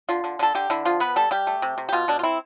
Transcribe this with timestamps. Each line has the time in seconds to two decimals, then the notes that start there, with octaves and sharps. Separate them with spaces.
0.09 D3 F4
0.24 D3
0.39 D3 A4
0.55 D3 G4
0.70 D3 E4
0.85 F3 F4
1.00 B3 B4
1.16 G3 A4
1.31 G3 G4
1.47 A3
1.62 C3
1.78 C3
1.89 G4
1.93 B2 F4
2.08 B2 D4
2.19 F4
2.23 C4 E4